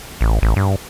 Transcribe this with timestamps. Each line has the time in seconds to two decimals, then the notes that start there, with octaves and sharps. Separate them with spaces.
0.21 A1
0.42 A1
0.56 G2